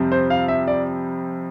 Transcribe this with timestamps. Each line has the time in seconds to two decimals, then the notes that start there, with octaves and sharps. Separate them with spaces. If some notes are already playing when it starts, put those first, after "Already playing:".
Already playing: F2 C3 G3 C4
0.12 C5
0.30 F5
0.48 E5
0.68 D5